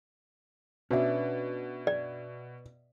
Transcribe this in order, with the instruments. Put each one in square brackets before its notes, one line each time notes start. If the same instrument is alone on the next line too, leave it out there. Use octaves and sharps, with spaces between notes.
[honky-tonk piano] B2 [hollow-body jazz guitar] C#4 D4 [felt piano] B4 E5
[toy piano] D5